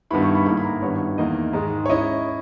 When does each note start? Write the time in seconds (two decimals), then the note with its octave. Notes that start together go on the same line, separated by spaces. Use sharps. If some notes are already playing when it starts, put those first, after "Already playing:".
0.11 G2 D#3 G3 B3 E4 B5
0.23 C#6
0.35 B5
0.46 G#2 D#3 A#3 E4 B5
0.57 B5
0.64 A#5
0.82 G2 D#3 G3 B3 E4 C#5
1.18 E2 D#3 A#3 E4 D#5
1.53 G#2 D#3 G#3
1.86 C#5
1.89 C#4 E4 D#5